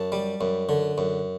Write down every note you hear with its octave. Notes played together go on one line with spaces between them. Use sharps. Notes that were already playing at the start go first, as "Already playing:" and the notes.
Already playing: F#2 A5
G3
F#2
D3
F#2